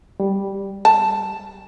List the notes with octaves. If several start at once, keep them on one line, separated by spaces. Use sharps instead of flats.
G3
A5